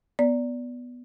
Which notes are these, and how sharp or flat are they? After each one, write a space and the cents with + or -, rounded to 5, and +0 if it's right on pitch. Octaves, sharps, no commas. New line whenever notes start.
B3 +0 D5 -15